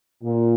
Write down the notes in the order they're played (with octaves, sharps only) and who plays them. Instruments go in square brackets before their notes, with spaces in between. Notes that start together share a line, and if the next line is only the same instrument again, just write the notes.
[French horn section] A#2